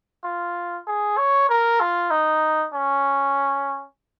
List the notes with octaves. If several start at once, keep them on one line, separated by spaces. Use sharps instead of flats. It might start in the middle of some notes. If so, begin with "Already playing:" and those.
F4
G#4
C#5
A#4
F4
D#4
C#4